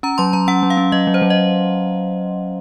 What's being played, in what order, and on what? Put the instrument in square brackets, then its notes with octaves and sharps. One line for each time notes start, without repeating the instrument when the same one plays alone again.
[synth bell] C#4 A#5
F#3 C6
F#3 A#5
C#4 F#5
F#3
F5
C#4
F#3 D#5
F#3
C5
F#3
D#5